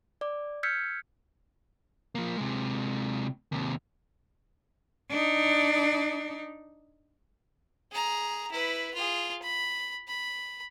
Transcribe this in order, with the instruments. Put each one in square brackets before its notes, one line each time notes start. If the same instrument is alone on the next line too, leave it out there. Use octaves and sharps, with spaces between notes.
[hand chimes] D5 D6
E6 F6 G6 G#6 B6 C#7
[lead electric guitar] F3 A#3
C3 G#3
D#2 C3
[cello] D4 D#4
[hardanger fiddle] G#4 A#5
E4 B4
F4 G#4
B5
B5